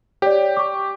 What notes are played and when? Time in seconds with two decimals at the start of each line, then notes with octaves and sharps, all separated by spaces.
0.22 G4 C#5 D5
0.57 C#6 D6